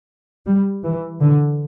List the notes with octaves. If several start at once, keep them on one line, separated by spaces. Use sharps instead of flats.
G3
E3
D3